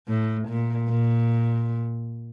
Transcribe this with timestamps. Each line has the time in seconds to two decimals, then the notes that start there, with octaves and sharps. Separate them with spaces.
0.08 A2
0.48 A#2
0.89 A#2